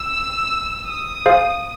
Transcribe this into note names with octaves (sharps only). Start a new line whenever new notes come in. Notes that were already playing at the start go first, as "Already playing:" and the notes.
Already playing: E6
D#6
G#4 C5 F5